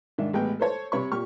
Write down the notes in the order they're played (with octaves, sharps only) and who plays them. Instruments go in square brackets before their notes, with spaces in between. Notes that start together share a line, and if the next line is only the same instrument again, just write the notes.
[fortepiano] G#2 D#3 D4 E5
A1 G#3 B3 G5
A4 C5 C#5 A5
C3 C#5 B5 C#6
A#2 G4 C#6 F6